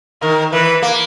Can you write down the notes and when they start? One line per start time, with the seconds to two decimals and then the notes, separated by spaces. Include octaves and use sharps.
0.21 D#3 A#4
0.53 E3 B4
0.82 A#3